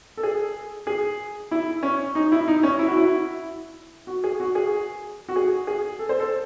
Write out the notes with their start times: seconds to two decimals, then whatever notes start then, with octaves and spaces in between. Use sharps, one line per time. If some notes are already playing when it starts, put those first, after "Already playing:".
0.17 A4
0.23 G#4
0.87 G#4
1.51 E4
1.83 C#4
2.15 D#4
2.32 E4
2.48 D#4
2.63 C#4
2.79 E4
2.88 F#4
2.97 E4
4.07 F#4
4.24 G#4
4.40 F#4
4.55 G#4
5.29 F#4
5.36 G#4
5.67 G#4
5.99 A4
6.09 C5
6.20 A4